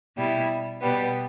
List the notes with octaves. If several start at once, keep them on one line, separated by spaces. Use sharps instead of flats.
B2 G3 E4
B2 G3 B3